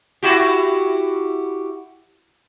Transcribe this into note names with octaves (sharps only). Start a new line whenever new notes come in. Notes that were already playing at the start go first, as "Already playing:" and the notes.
E4 F#4 G4